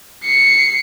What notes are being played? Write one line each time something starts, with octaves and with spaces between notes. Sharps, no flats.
C7 C#7